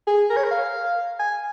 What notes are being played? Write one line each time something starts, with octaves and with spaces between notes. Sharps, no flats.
G#4
A#4
C#5
A#4
F5
G#5